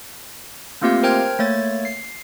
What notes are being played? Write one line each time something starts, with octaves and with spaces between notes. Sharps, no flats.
A3 A#3 C4 F4 G4 F5
A#4 C5 G5 F6 G#6
A3 A#3 C#5 A6
C7